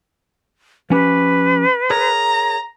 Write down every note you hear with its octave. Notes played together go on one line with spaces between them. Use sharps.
F3 C#4 G4 B4
G#4 A#4 C#5 A#5